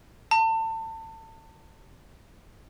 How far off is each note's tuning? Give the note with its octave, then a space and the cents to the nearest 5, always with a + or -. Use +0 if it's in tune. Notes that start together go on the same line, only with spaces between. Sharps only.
A5 +30